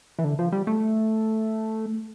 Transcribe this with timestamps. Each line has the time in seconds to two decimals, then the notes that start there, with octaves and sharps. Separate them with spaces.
0.19 E3
0.24 D3
0.39 F3
0.52 G3
0.67 A3